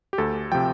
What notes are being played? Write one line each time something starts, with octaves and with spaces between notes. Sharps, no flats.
G4
D2 A4
C3 F3 G5